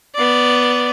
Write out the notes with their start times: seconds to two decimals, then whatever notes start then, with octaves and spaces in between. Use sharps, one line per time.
0.15 B3 D5